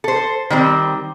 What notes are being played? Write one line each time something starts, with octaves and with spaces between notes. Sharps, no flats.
A4 C5
D#3 G3 C4